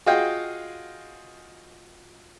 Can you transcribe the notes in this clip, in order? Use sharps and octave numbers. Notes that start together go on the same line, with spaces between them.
F4 F#4 G#4 D#5 F5 G5